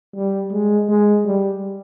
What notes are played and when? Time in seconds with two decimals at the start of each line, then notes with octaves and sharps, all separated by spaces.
0.15 G3
0.52 G#3
0.89 G#3
1.25 G3